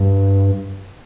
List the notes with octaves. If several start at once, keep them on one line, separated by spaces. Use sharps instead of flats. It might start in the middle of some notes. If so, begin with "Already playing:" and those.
Already playing: G2